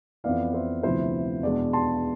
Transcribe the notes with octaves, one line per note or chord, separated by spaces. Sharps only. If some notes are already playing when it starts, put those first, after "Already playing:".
F2 E3 B3 E4 D5 F5
C5 E5
D2 C3 F3 B3 E4 C5
E2 B2 G#3 D4 D5
A5 C6